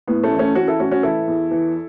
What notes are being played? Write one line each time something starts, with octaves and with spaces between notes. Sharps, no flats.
A2 B3
A3 C#4
E3 E4
A3 C#4
E3 C#4 F#4
E4 A4
A2 C#4 F#4
C#4 F#4
E3 E4 A4
E2
E3